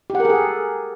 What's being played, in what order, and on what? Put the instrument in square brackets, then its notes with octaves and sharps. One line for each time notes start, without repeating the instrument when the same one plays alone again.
[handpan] G4
F#5
A#4
G#4
A4